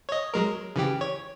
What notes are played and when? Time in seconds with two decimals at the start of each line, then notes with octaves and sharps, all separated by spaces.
0.09 C#5 D#5
0.34 F#3 G#3 A#4
0.76 C#3 E3 G4
1.01 C#5